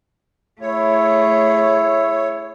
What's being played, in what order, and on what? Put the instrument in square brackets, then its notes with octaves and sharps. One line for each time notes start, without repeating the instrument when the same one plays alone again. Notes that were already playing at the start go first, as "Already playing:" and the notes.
[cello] A3 G#4 [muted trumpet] E4 [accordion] C#5